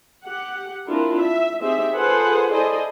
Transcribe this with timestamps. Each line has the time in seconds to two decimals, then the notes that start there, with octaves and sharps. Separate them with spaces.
0.24 G4 F#5
0.88 C4 D4 E4 F4 A#4
1.20 E5
1.61 C4 D#4 G4 G#4 E5
1.95 F4 G#4 A4 B4 C5 F#5
2.53 E4 G#4 A4 C5 D5 D#5